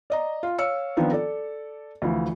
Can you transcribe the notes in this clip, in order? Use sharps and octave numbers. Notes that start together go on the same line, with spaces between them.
D5 D#5 A#5
F4
C#5 F5 E6 C#7
D#3 F3 B3 C4 D4
A4 D5
D2 E3 F3